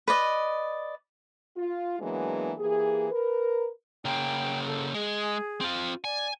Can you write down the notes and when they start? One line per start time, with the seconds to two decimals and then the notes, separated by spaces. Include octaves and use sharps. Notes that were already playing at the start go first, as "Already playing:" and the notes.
0.08 B4 D5 D#5
1.56 F4
2.00 E3 F#3 G#3 A#3 B3 D4
2.58 E3 A#3 G4 G#4
3.10 A#4 B4
4.05 C#3 A#3 G5
4.67 A4
4.94 G#3 G#4
5.61 C4 F4
6.04 D5 G#5